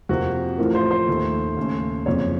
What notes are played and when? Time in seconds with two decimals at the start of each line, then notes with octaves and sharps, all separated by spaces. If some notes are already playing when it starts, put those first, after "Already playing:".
0.09 F2 C3 F3 A#3 F#4
0.58 A1 A2 F3 A3 A#4
0.75 C5
0.91 C5
1.07 D#2 D#3 A3
1.57 D#2 C#3 A3
2.06 F#1 F2 C#3 C#5